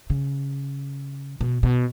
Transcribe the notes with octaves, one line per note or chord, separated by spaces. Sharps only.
C#3
B2
B2